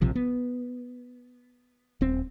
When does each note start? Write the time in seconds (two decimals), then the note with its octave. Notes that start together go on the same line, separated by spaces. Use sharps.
0.01 A#1 C3 F3
0.15 B3
2.01 D#1 C4